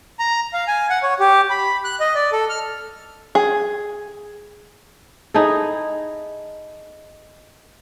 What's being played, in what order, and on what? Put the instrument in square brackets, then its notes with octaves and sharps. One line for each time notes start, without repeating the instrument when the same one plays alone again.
[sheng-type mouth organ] A#5
F5
G#5
F#5
C#5
G4
B5
F#6
D#5
D5
A4
F6
[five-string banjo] G#4
[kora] D#4 E4 G#4 A4